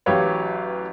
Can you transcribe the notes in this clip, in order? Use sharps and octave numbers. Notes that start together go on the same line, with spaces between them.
A1 F#3 G4 B4 C#5 F5